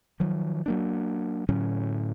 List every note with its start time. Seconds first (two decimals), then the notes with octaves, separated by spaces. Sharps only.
0.20 D#3 F3 F#3
0.66 F#3 A#3 D4
1.49 A2 D3 F#3 C#4